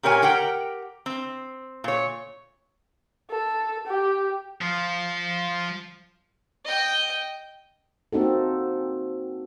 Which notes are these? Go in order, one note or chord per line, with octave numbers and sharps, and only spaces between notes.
A#2 G4 A#4 C#5 G#5
G4 A#4 F#5 G5
C4
A#2 C#5
A4
G4
F3 F4
D#5 G5
A#3 C4 D#4 F#4 A4